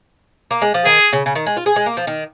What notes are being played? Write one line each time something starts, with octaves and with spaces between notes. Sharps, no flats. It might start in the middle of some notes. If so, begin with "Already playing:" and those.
A#3
G#3
F3
D#3 G#4
C#3
C#3
D#3
G#3
F4
G#4
G#3
A#3
F3
D#3